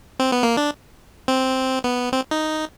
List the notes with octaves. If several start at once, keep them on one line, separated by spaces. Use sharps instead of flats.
C4
B3
A#3
D4
C4
B3
C4
D#4